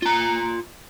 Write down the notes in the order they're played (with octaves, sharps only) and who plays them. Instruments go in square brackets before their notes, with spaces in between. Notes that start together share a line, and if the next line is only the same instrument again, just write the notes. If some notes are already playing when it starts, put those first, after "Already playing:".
[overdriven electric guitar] F4 A#5